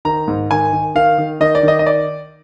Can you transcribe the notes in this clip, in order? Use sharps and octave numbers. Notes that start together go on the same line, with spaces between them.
D#3 A#5
G#2
D#3 G#5
D#3
D#3 F5
D#3
D#3 D#5
D5
D#3 D#5
D#5
D5